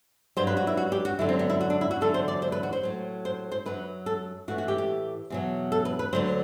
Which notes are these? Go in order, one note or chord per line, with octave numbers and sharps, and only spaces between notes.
G2 F#3 C5
B4
F#4
E4
F#4
G4
F#4
F#2 D3 F#3 E4
C4
B3
E4
F#4
D4
E4
F#4
E2 D3 F#3 A4
C5
D5
C5
B4
F#4
C5
A2 F#3
C5
C5
F#2 F#3 B4
A4
A2 E3 F#4
F#4
G4
G4
E2 B2 F#3
A4
B4
B4
D2 D3 F#3 C5